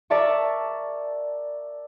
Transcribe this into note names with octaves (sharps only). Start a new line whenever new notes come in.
A#4 D5 E5 A5 C#6